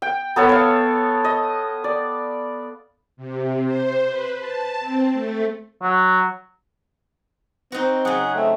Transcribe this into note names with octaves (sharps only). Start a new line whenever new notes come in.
G5
B3 A4 C#5
C#5 F5
D#5
D5
C3
C5
B4
A5
C4
A3
F#3
C4 D#4 F#4
C#3 F#3 G#4 F#5
A3 C4